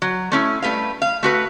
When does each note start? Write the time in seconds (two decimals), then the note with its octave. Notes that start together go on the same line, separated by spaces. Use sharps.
0.02 F#3
0.32 A3 C#4 E4
0.62 G3 A3 G#4 B4 F5
1.02 F5
1.23 A3 F#4 B4